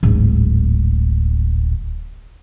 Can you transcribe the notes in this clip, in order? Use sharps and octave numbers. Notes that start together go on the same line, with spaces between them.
D1 G#1